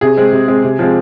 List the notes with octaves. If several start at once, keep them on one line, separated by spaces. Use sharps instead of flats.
C3 G#4
G#3 C4
C3
G#3 C4
C3
F3 G#3 C4